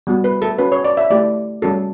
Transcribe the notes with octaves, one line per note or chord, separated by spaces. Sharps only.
G3 B3 F#4
B4
A4
C#4 F#4 B4
C#5
D5
E5
A3 E4 G4 D5
G3 C#4 F#4 A4